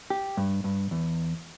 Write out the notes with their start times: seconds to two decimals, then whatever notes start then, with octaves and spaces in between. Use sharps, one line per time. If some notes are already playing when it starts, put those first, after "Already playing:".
0.10 G4
0.37 G2
0.64 G2
0.91 E2